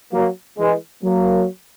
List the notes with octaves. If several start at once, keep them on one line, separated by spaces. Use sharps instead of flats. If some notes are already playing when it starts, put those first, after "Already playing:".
F#3 A#3
E3 G#3
F#3 A#3